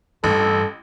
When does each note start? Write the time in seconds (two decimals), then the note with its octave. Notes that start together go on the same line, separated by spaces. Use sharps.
0.24 A1 G2 A4